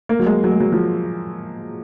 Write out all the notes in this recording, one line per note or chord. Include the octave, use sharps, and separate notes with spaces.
A#3
F#3
G#3
F#3
G#3
F#3
F3